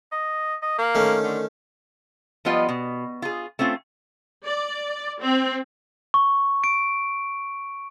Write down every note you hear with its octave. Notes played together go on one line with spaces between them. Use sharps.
D#5
D#5
A#3
D#3 A3 C#4
D3
F3 G3 B3 F4 D#5
B2
F4 G#4
A3 C4 C#4 F4
D5
C4
C#6
D7